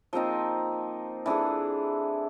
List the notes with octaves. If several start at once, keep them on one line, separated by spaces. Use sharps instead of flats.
F3 A#3 C4 D#4
E3 D4 G#4 A4